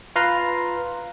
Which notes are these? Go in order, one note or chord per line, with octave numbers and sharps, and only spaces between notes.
F4 B4 F5 A#5 C6